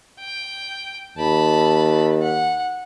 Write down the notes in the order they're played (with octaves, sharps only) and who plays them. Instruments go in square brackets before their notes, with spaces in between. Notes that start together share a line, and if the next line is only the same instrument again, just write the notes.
[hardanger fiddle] G5
[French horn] D#2 [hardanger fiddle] A5 B5
[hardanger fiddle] F#5